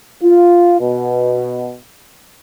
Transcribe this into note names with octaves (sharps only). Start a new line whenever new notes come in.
F4
B2